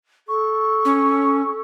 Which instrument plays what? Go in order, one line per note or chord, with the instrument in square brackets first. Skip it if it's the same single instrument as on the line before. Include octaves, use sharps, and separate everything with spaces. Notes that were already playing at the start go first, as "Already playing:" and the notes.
[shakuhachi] A4 [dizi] C#6
[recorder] C#4